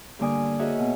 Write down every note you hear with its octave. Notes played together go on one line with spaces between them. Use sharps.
G2 D3 A#3 D5 G#5 D#6
F#4 G#4 A#4 C#5 D#5 E5
B2